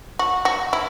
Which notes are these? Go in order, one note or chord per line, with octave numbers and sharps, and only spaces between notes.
F#4
F#4
E4